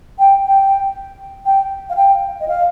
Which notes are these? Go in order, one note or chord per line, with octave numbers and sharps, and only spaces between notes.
G5
G5
G5
F5
G5
D#5
F5